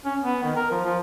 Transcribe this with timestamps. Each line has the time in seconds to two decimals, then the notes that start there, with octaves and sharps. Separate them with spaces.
0.05 C#4
0.21 B3
0.43 D#3
0.56 A#4
0.71 F3
0.85 F3